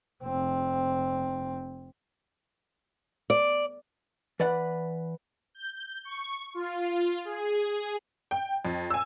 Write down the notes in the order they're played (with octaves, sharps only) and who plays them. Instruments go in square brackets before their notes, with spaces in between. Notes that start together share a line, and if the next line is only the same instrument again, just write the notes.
[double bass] F1 C4
[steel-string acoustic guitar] D5
[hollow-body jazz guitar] E3 D5 F#5 [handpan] B4
[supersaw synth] G6
C#6
F4
G#4
[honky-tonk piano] G5
F2
G#5 E6